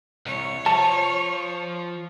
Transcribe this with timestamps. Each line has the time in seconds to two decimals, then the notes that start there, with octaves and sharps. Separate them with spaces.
0.26 C2 C#5
0.66 F3 A5